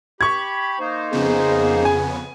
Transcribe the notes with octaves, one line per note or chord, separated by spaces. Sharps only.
G4 B5 C#6 G#6
A#3 D#4 C5
F2 C#3 B3 G#4
G#5